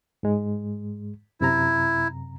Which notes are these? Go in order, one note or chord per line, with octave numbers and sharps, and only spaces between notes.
G#2 G#3
F#2 C3 E4 A#5